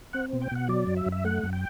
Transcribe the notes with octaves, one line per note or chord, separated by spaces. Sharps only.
C4 F#5
B2
G5
B2 F#5
F#3 D5
F#2
E5
F#2
E5
A3 F#5
F#2
G5